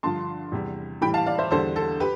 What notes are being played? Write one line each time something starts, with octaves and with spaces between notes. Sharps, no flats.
G2 D3 F3 A5 C6
E2 C3 G3
A2 E3 G3 G5 B5
F5 A5
D5 F5
C5 E5
E2 D3 G3 A4 C5
A4
G4 B4